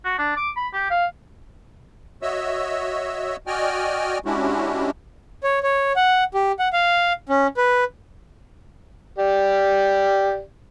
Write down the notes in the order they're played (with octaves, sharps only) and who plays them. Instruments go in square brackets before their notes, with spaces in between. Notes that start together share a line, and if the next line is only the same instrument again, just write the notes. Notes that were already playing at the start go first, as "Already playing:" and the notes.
[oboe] F#4
D4
D6
B5
G4
F5
[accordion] F#4 C#5 D#5 E5 E6
F#4 D5 D#5 G5 G#5 F6
G#3 C#4 D4 E4 F#4 G4
[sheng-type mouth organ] C#5
C#5
F#5
G4
F#5
F5
C#4
B4
[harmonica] G4 D5